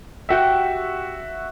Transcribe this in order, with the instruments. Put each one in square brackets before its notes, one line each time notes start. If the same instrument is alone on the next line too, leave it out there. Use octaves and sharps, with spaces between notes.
[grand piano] F#4 E5 [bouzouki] G4 F#5 G5